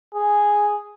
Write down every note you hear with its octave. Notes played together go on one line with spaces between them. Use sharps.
G#4